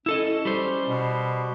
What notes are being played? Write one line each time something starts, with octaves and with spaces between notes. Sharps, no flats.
C#4 E4 A4 D#5
G3 C5
B2